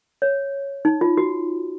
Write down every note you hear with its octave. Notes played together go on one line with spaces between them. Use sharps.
C#5
D#4
F4
F#4